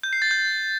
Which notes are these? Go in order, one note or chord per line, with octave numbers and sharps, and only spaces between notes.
G6
C7
A6
G6